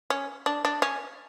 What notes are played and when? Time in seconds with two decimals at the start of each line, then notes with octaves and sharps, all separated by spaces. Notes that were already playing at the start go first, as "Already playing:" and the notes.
0.10 C#4
0.46 D4
0.65 D4
0.82 C#4